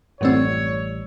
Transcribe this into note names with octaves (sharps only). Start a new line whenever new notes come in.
A1 F#2 G3 A3 C4 C#5 E6